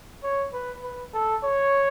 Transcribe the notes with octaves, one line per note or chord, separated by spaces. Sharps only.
C#5
B4
B4
A4
C#5